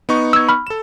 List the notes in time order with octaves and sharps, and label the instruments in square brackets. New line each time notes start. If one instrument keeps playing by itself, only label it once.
[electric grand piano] B3 D#4 C#6
[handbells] E6 G#6
B5 F6
[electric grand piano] A4 E7